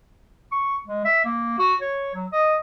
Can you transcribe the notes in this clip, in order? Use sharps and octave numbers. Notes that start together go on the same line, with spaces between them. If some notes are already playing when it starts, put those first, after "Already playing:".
C#6
G#3
E5
A#3
F#4
C#5
F#3
D#5